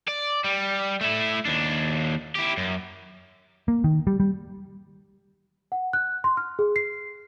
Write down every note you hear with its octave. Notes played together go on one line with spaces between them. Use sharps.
D5
G3
A3 E4
D#2 D4
E4 G4
F#2
A#3
D#3
G3
G3
F#5
F#6
C6
F6
G#4
C7